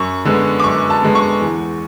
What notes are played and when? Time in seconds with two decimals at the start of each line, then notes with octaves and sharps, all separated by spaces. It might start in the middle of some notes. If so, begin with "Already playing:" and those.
Already playing: F#2 C#6
0.25 D3 G#3 B3
0.60 D6
0.64 F#2 C#6
0.90 A5
1.02 D3 G#3 B3
1.15 C#6
1.41 E2